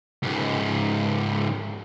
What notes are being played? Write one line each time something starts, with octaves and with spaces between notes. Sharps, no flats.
C#2 G#2